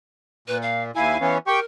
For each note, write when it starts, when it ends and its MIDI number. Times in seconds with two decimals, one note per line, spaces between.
0.48 0.91 46
0.48 0.57 71
0.62 0.83 77
0.96 1.17 39
0.96 1.17 64
0.96 1.34 77
0.96 1.17 80
1.21 1.38 52
1.21 1.38 59
1.21 1.38 61
1.47 1.60 67
1.47 1.64 70
1.47 1.60 79
1.47 1.60 85